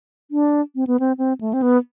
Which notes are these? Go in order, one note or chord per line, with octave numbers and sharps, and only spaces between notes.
D4
C4
B3
C4
C4
A3
C4
B3